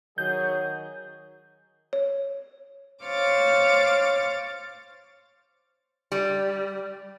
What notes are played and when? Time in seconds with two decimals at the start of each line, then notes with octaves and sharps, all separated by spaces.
0.18 D#3 F#3 G#4 G6
1.93 C#5
3.04 C5 C#5 F5 D6 A6
6.12 G3